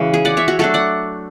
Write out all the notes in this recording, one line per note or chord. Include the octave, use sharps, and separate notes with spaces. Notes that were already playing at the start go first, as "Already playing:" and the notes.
Already playing: C#3 E3 G#3 F#4
G#4
D5 F#5
C#5 E5
F#4
F#3 A3 D4 F#4 A4
D5 F#5